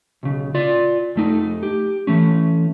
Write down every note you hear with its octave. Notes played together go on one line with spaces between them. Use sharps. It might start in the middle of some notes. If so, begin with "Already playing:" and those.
B1 C#3
F4 D5
F2 A3 D#4
G4
E3 A3 C#4